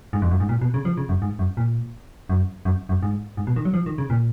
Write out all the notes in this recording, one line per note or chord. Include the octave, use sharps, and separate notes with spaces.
G#2
F2
F#2
G#2
A#2
B2
C#3
F3
C#3
F#2
G#2
F#2
A#2
F#2
F#2
F#2
G#2
G#2
B2
D#3
F#3
F3
D#3
C#3
A#2